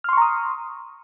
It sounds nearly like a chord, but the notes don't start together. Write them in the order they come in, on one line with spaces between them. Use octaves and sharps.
F6 C6 C#6 A#5 D#6